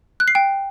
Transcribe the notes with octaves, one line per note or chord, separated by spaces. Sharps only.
F#6
C7
G5